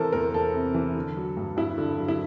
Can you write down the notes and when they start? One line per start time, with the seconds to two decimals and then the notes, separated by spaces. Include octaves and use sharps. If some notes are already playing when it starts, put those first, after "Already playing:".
Already playing: C3 E3 A4 A#4 C5
0.12 E2 A#4
0.34 E2 A4
0.54 C3
0.74 E3
0.95 D3
1.17 F#3
1.37 G2
1.57 G2 E4
1.78 D3
1.99 F#3
2.08 E4